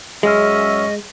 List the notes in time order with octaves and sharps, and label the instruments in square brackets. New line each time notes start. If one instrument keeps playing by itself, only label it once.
[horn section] F#2 C#4 E5 [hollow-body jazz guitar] G#3 [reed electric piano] G#4 F6 [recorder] D#5